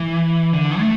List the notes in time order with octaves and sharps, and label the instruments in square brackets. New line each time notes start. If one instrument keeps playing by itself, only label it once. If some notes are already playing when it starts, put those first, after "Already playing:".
Already playing: [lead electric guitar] E3
D3
A3